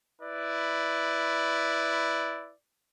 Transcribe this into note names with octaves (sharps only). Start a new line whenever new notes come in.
E4 B4 D5